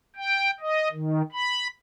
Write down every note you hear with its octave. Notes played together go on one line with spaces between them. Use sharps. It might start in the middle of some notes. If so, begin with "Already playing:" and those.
G5
D#5
D#3
B5